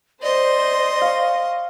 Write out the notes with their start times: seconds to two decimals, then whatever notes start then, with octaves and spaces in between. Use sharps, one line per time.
0.22 C5 D5 D#5 C6
1.02 F5 C#6